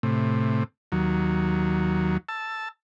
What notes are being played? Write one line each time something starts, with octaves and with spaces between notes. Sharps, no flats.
A2 C3
D#2 F#3
A5 E6